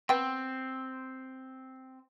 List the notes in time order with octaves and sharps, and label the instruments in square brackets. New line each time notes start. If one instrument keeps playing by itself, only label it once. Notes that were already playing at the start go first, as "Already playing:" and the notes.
[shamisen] B3 G5 [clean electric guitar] C4